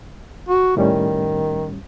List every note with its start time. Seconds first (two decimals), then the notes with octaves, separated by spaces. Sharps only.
0.48 F#4
0.77 A2 D#3 G3 C#4